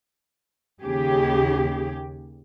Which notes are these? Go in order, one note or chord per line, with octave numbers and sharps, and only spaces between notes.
D#2 C#3 G4 G#4